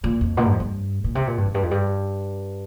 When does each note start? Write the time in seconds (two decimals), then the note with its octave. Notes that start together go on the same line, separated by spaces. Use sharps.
0.04 A#2
0.21 F2
0.37 A#2
0.45 G2
0.52 F2
0.60 G2
1.04 A#2
1.15 C3
1.27 A#2
1.38 G2
1.46 F2
1.54 G2
1.63 F2
1.71 G2